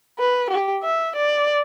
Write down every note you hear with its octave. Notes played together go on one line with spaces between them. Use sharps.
B4
G4
E5
D5